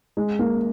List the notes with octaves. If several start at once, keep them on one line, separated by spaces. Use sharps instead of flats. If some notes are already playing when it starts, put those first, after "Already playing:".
G#3
A#3